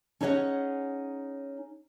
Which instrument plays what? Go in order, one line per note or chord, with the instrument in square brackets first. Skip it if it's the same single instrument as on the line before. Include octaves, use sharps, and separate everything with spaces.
[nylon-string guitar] C#4 D#4 G#4 C#5 D#5 F#5